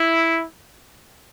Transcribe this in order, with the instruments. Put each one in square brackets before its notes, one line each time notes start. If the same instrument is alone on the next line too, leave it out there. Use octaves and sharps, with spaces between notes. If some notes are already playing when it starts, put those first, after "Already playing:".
Already playing: [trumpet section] E4